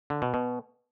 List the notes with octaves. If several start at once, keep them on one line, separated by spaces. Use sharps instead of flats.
D3
B2
B2